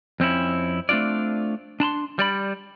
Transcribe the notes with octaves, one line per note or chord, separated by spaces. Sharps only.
F2 C4 C#4 E4
A3 C4 D4 F4 D5
D4 A5 B5 C6
G3 D5 B5